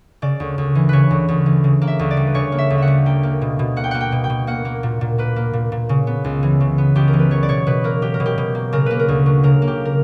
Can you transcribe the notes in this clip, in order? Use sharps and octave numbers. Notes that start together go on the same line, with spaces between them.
C#3 D5
D2
D2
E3
C#3 B4 C#5
D2
D2
E3
C#3
A#3
E5
D2
D5
G3
B4
C#3 C#5
A#3
E5
D2
E5 F#5
G3
A#3 G5
A#3
B2
B2
A#3 F#5
G5
A#3 F#5
G5
B2
G5
B2
A#3 F#5
A#3
A#2
A#2
A#3 B4
A#3
A#2
A#2
C#3
B3
C#2
E3
C#3
B3
C#2 G4
A#4
E3
B4
F#3 C#5
D5
B2 C#5
B2 B4
A#3 A#4
F#3 G4
A#4
B2
G4
B2
A#3
C#3 A#4
A#3 B4
A#4
D2
F#3
C#3 A#4
A#3
G4
A#4